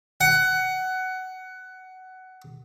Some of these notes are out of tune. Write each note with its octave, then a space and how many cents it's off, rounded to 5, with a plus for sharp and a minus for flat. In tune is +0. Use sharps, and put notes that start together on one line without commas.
F#5 +15